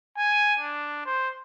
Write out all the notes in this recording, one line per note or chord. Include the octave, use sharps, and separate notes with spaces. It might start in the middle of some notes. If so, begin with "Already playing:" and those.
G#5
D4
C5